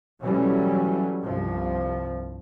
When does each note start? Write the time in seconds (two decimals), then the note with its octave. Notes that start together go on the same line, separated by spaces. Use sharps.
0.21 B2 E3 F#3 G3 A3 C#4
1.22 C2 G2 F3